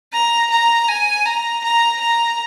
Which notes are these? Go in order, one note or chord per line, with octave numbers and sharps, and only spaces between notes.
A#5
A#5
G#5
A#5
A#5
A#5